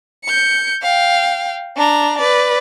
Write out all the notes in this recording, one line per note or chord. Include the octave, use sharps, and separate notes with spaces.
G6 C#7
F5 G5
D4 A#5
B4 D5